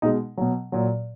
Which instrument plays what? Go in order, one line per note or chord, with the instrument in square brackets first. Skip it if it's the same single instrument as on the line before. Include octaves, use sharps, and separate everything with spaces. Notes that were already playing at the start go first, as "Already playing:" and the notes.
[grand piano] B2 G#3 D#4
B2 F#3
A#2 F#3